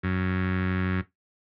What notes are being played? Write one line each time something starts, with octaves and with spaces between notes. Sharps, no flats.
F#2